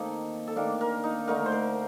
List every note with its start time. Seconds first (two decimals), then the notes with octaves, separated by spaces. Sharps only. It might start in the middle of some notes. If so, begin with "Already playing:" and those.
Already playing: D#3 A#3 C4 D#4 A4
0.48 A4
0.56 D#3 A#3 D4 A#4
0.81 A#4
1.04 D#4
1.28 D3 A3 D#4 A#4
1.46 C5
1.52 A#4